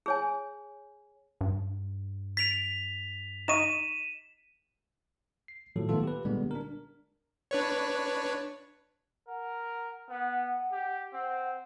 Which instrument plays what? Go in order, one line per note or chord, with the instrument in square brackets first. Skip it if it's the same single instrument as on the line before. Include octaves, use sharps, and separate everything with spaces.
[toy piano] G#4 C#5 G#5
[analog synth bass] G2
[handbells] A6 D7 [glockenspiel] B6 F7
[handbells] D#4 D#5 C#6 [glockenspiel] D#7 E7
[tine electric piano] C7
A2 D#3 F3 F#3 F4 A4
A#2 D#3 A3 B3 F4 A4
G4 B4
A#2 D3 G3 G#3 B3
D4 A#4
[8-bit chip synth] D4 B4 C#5
[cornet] A#4 [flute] F#5
[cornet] B3 [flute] F#5
[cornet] G4
[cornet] C4 [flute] F#5